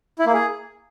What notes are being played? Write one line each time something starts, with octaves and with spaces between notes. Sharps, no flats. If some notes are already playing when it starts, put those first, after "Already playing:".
E4
A#3
G#4